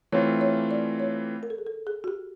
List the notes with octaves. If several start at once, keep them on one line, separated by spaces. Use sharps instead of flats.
E3 A3 C4 F4 C#5
C#5
D5
C#5
A#4
A4
G#4
A4
G#4
F#4
G4